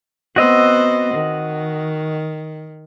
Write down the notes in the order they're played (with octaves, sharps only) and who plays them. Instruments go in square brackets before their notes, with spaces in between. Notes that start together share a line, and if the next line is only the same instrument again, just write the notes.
[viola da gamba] B3 C4 C5 [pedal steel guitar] F#4 D#5 E6
[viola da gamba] D#3